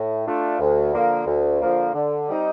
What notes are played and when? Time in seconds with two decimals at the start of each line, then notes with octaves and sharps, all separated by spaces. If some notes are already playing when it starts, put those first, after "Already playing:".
Already playing: A2
0.26 A3 D4 F4
0.59 D2
0.93 D3 F3 A#3
1.26 D2
1.61 D3 F3 A#3
1.94 D3
2.28 G3 C4 D#4